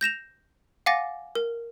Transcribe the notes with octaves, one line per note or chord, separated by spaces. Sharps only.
G6 A#6 E7 F7
F5 F#5 G#5 D6 A6 A#6
A#4